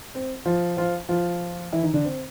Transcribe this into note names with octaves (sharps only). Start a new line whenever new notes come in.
C4
F3 F4
F3 F4
F3 F4
E3 E4
D#3 D#4
D3 D4
C4